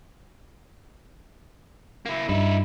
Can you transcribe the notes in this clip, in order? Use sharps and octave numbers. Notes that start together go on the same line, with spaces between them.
A#3 E4
G2 D#4 E4